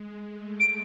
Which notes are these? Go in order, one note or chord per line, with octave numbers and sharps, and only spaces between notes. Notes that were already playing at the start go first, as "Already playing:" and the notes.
Already playing: G#3
A3
D7